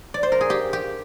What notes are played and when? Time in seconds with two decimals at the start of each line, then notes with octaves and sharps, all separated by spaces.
0.14 D5
0.23 C5
0.32 A#4
0.41 G#4
0.50 G4
0.73 G4